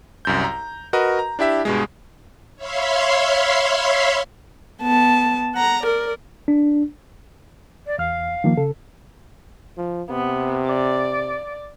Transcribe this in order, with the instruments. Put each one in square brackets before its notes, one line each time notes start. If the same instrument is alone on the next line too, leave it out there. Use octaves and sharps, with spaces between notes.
[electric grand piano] C2 F#2 G6
A#5
F#4 A#4 B4 D#5
A#5
D4 E4 G4 E5
G2 B2 G#3
[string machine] C#5 E5 F5 B5 C6
[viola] B3 A5
F#5 A#5
A#4 D5
[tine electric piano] D4
[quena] D5
[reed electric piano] E2 F6 [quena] F5
[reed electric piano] D#3 F3 A#3
C#3 A4
[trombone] F3
[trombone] C3 [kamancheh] B3
[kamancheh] D5